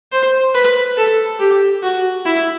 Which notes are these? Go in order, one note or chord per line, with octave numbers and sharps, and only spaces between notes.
C5
B4
A4
G4
F#4
E4